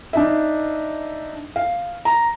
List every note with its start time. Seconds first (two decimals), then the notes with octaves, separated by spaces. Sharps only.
0.13 D4 D#4 E5
1.56 F5
2.05 A#5